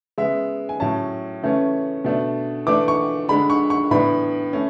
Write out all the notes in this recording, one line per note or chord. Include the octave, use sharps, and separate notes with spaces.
C#3 G#3 B3 E5
G#5
A2 F#3 C#4 A5
C#3 E3 A3 C#4
B2 A3 D4
E3 A3 D4 D6
C#6
D3 G#3 D4 B5
C#6
C#6
A2 E3 B3 D4 B5
A3 C#4